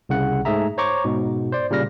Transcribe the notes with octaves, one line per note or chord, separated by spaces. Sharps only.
C2 C#3 F#5
G#2 A3 G#4 E5 A#5
C5 C#5 A#5 C#6 D6
G#2 B2
C5 D5
A#2 C#3 G3 F6 A#6